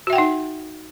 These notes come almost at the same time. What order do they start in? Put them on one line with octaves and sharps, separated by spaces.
F#4 E5 G5 F#5 D#4